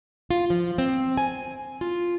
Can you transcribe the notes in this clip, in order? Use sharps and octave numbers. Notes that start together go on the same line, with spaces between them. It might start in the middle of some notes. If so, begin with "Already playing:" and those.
F4
F3
C4
G#5
F4